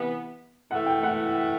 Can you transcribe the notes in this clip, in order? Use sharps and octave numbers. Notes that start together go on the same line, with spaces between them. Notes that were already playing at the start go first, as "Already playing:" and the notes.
Already playing: C3 E3 B3
A2 E3 A3 F#5
G5
F#5